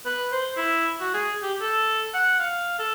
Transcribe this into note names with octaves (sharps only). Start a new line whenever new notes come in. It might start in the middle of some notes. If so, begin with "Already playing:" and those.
B4
C5
E4
F#4
G#4
G4
A4
F#5
F5
A4